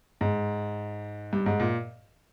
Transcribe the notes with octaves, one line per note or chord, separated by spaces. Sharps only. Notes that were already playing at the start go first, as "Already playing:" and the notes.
G#2
G2
G#2
A#2